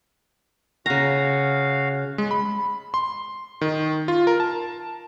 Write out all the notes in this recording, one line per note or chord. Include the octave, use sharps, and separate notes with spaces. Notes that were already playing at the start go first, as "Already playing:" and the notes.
C#3 F#4 F5 A#5
G#3
B5
C6
D#3
F4
A#4
A5